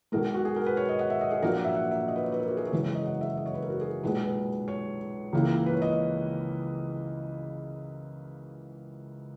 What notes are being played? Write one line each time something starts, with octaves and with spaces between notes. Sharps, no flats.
B1 B2 G#3 A#4
F#4
G#4
A#4
B4
C#5
D#5
F#5
E5
D#5
G#4
A#1 A#2 F#3 A#3 A#4
F#5
E5
F#5
E5
D#5
B4
C#5
B4
A#4
F#4
G#4
C#5
F#1 F#2 E3 G#3 B4
C#5
D#5
F#5
E5
D#5
C#5
B4
A#4
F#4
G#4
B1 A#2 G#3 B4
B4
C#5
C#2 C#3 E3 A#3
B4
C#5
D#5